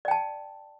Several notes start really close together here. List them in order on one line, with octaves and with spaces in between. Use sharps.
D5 G5 A5